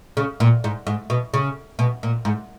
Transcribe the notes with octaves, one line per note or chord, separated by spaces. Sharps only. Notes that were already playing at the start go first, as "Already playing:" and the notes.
C#3
A#2
G#2
G#2
B2
C#3
B2
A#2
G#2